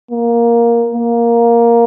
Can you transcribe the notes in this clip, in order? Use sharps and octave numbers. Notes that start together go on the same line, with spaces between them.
A#3
A#3